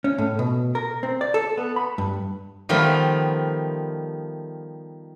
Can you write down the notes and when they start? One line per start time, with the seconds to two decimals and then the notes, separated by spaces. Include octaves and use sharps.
0.04 C#4
0.18 A2
0.39 B2
0.75 A#4
1.03 C4
1.21 D5
1.34 A4
1.57 B3
1.76 B5
1.98 G2
2.69 D#3 F3 G3 A3 B3 F4